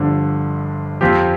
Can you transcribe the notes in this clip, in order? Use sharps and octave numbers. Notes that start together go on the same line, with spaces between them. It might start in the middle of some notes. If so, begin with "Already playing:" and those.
Already playing: G1 G2 D3 F3 D4
F2 F3 C4 G4